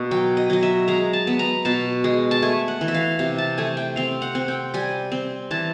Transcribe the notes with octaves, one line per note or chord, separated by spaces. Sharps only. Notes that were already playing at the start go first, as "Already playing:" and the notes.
Already playing: B2 A#3
F#3 G5
D#5
F#3 D#5
E5
G#3 A#5
A5
B3
A#5
B2 A5
G#3
A5
A3 G#5
F#5
E3
E5
F5
C3
A5
A3 G#5
G5
C4 F5
F#5
C4
G5
G3 G#5
C4
E3 A5